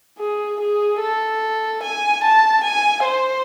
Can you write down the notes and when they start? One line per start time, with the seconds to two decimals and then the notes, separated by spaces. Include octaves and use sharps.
0.19 G#4
0.61 G#4
1.01 A4
1.83 G#5
2.24 A5
2.64 G#5
3.05 C5